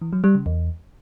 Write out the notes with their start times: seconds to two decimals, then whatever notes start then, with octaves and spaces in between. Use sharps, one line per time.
0.01 E3
0.13 F#3
0.24 G3
0.35 C#3
0.46 E2